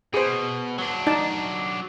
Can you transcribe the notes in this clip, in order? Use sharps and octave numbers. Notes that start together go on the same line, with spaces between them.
B2 G#4 C5
F#3 D4
D#4 D5 A5